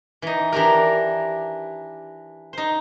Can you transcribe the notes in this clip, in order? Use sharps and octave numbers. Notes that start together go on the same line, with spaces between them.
E3 D#4
E3 D4 G4 A#4
D#4 C5